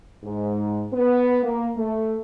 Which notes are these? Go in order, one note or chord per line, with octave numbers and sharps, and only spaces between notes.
G#2
B3
A#3
A3